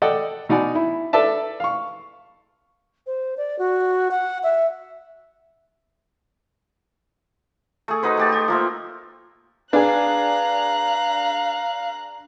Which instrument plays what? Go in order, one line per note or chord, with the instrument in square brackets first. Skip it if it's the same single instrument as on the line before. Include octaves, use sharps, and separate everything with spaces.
[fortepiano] A4 D5 D#5 F#5 G5
B2 D#4 D5 F#5 G#5
E4
A4 B4 D5 E5 A5
F5 C#6
[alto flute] C5
D5
F#4
F#5
E5
[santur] A3 G#4
D#4 F#4 B4 C5
A3 G4 A5
G4
F3 A#3 E5
[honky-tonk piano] D4 G#4 [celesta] B4 [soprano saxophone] F5 [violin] A#5 F#6